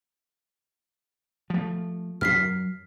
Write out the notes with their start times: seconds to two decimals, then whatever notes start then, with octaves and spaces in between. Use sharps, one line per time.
1.50 F3 A3
2.21 F#2 F#3 F6 B6 C7